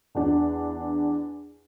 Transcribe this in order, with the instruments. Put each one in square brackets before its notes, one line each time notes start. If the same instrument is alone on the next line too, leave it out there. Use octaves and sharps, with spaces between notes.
[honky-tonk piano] E2 D4